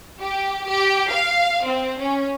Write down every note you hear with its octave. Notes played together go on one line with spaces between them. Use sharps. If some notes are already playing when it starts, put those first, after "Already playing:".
G4
G4
F5
C4
C#4